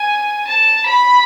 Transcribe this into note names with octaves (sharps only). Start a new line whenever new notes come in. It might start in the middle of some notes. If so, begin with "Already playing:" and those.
Already playing: G#5
A5
B5